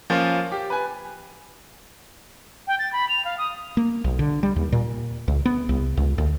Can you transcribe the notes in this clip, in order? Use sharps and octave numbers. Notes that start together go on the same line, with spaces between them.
F3 A#3 C#4 F4
G4
B4 G#5
G5
A6
B5
F7
F5
D#6
A#3
B1
D3
G3
D#2
A#2
C#2
B3
C2
C#2
D2